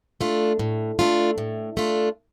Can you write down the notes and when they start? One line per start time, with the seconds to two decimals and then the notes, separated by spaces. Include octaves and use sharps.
0.21 A3 D4 F4
0.59 A2
0.99 A3 D4 F4
1.38 A2
1.77 A3 D4 F4